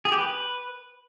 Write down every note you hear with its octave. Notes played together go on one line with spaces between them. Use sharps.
G#4
G4
B4